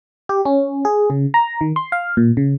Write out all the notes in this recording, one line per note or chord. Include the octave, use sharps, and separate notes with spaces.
G4
C#4
G#4
C#3
A#5
D#3
C6
F5
A#2
C#3